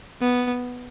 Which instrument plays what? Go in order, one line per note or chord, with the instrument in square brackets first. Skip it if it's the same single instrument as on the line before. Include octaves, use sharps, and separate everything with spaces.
[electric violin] B3